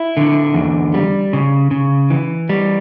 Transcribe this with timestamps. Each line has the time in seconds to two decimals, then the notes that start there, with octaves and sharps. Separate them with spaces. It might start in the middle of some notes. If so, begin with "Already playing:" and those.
Already playing: E4
0.17 D3
0.54 E2
0.94 G3
1.33 C#3
1.71 C#3
2.10 E3
2.49 G3